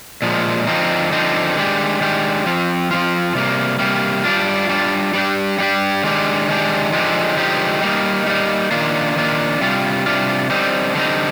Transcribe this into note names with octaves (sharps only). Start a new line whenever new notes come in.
A#2 F3 G#3
D3 F3 C4 D#4
D3 F3 C4 D#4
D#3 G#3 D4 G4
D#3 G#3 D4 G4
F3 C4 F4
F3 C4 F4
C3 G3 A#3
C3 G3 A#3
G3 D4 F4
G3 D4 F4
G3 D4 G4
G3 D4 G4
D#3 G#3 D4 G4
D#3 G#3 D4 G4
D3 F3 G#3 D#4 G4
D3 F3 G#3 D#4 G4
G3 A#3 D#4
G3 A#3 D#4
D#3 A#3 D4 F4
D#3 A#3 D4 F4
C3 G3 D4 F4
C3 G3 D4 F4
D3 G3 C4 D#4
D3 G3 C4 D#4